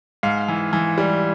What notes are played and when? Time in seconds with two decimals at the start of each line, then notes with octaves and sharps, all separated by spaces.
0.23 G#2 F5
0.48 E3
0.73 E3
0.98 G3